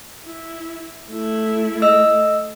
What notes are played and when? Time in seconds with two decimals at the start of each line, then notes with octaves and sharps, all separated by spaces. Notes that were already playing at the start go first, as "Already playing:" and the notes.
0.24 E4
1.10 A3 E4
1.82 D#5 E6